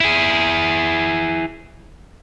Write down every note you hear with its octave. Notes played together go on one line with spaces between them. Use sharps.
E4 G#4